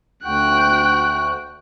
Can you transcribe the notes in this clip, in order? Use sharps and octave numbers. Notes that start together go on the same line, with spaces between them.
D2 F#4 G5 F#6